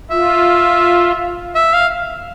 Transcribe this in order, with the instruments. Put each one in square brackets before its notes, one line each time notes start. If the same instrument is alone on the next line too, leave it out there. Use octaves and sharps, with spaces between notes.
[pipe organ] F4 [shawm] E5
[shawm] E5
F5